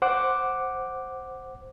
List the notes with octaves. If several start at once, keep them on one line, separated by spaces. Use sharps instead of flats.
C5 F#5 D6